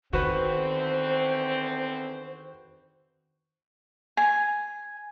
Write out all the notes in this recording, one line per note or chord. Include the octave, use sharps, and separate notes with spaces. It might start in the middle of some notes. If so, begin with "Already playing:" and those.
E2 D3 D#3 C4 F#4 B4 C5
G#5